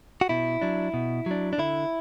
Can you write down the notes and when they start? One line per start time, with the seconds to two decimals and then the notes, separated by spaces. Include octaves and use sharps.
0.21 F#4
0.29 B2 E4
0.62 F#3 D4
0.94 B2
1.26 F#3 D4
1.53 D4
1.58 D3 E4